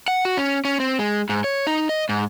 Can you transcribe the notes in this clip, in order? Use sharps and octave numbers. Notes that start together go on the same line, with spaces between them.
F#5
F#4
C#4
C#4
C4
G#3
G#2
C#5
D#4
D#5
G#2